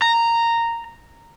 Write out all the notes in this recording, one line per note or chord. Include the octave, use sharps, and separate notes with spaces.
A#5